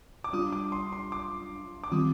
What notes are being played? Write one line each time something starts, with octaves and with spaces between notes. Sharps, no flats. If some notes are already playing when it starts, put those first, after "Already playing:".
D6
G3 D4 F4 D#6
D6
C6
C6
D6
D6
D#3 G3 C4 F4 D#6